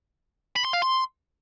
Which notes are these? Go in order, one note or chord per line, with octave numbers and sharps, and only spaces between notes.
B5
C6
F5
C6